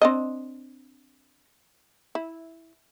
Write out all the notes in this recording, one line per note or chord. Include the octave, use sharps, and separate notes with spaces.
C4 D4 D#5
E4